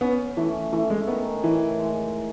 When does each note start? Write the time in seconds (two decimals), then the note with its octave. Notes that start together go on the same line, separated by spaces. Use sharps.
0.01 B3 C#4
0.37 E3 A3
0.73 E3 A3
0.90 G#3
1.07 D#3 B3
1.44 A2 E3
1.79 G#3